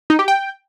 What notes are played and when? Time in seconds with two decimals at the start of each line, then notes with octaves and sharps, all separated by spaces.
0.10 D#4
0.19 G4
0.28 G5